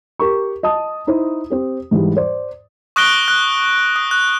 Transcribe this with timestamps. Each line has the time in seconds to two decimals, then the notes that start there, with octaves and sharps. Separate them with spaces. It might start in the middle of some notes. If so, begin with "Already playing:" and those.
0.19 G4 A#4 C#6
0.63 D#5 A5 D#6
1.07 D#4 E4 C5
1.50 C4 G4
1.91 G#2 E3 G3
2.16 C5 D5
2.96 C#6 D#6 F#6 A#6 D7 G7
3.28 F#6
3.96 D#6
4.11 F#6